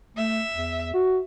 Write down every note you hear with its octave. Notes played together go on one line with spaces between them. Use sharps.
A3 E5
E2
F#4